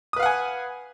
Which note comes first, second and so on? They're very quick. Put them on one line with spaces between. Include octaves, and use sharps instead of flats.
D#6 B4 F5 F#5 G#5